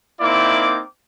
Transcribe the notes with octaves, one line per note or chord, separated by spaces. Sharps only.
A#3 C4 D#4 E4 D5 D6